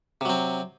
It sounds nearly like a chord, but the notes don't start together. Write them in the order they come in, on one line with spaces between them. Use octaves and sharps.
C3 F#3 C4